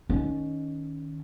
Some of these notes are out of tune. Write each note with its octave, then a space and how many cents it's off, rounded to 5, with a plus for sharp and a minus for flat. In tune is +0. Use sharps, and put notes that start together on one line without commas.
D#3 +0 C#4 +10